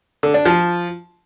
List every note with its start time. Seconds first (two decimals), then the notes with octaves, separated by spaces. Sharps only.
0.23 D3
0.34 D4
0.45 F3